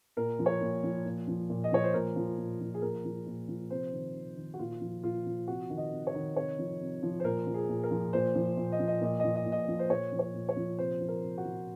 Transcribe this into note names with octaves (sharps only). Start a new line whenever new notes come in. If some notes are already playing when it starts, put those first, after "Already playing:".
A#2 A#4
F3
C#5
A#2
F3
A#2
F3
A#2
D#5
F3 C#5
C5
A#2 A#4
F3
A#2
F3
G#4
A#2 A#4
F3
A#2
F3
C3 C5
D#3
C3
D#3
F#4
A#2 F4
F3
A#2 F4
F3
C3 F#4
D#3
D#5
C3
C#5
D#3
C3 C#5
F3
C3
F3
C5
A#2 A#4
F3
G#4
A#2
A#4
F3
A#2 C5
F3
A#2
D#5
F3
D#5
A#2 D#5
D#5
F3
D#5
A#2
D#5
F3
C5
A#2 C#5
F3
C#5
A#2
C#5
F3
C3 C5
F3
A#4
C3
F#4
F3